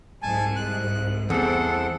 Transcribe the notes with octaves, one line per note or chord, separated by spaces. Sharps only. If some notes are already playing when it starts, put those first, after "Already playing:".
C2 G#2 G#5 A5
F#6
E2 A3 C4 A4 F#5